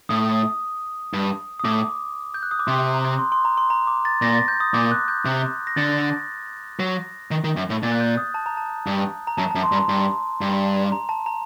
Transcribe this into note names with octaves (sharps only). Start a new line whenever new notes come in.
A2 D#6
D#6
G2
D#6
A2 D6
G6
F#6
D#6
D6
C3 C6
A#5
C6
C6
A#5
C6
A#5
D6
A6
A#2 A#6
A6
G6
D#6
A#2 D6
F#6
G6
C3
A#6
D3 A6
F#3 A#6
D#3
D#3
F#2
A2
A#2 A6
F#6
G6
D#6
A5
A#5
A5
G2
A#5
F#2 A5
A5
F#2
C6
G2
A#5
G2
G2
A#5
A5
A#5